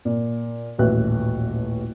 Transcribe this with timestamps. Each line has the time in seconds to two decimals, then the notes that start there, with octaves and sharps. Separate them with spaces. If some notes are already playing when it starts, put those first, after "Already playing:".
0.05 A#2
0.78 D#1 A1 F#4 B4 E5 F#6